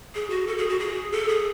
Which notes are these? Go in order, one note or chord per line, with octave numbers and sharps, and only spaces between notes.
G#4
F#4
A4
G#4
F#4
G#4
A4
G#4